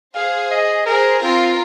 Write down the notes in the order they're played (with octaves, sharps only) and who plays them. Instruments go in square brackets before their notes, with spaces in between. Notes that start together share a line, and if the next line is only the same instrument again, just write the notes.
[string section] G#4 C5 [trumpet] F5
[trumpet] D#5
[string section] G#4 C5 [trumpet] A#4
[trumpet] C4 [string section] F4 A#4